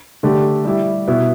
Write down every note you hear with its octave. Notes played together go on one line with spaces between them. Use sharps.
D3 A3 G4
G3 E4 G4
B2 B3 E4